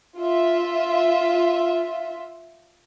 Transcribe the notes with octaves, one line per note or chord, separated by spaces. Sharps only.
F4 E5